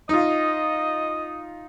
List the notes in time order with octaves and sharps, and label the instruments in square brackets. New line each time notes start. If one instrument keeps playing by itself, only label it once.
[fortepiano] D#4 F4 [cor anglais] D#5